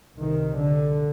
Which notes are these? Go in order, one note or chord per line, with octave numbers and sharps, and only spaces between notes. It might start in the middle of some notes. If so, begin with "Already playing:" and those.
C2 C3 D#3
D3